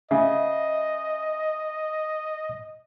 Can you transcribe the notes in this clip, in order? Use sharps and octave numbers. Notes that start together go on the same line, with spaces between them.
C#3 D#5 E5